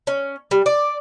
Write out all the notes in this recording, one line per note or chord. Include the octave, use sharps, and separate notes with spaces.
C#4
G3
D5